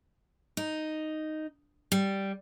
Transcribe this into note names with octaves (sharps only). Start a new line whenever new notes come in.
D#4
G3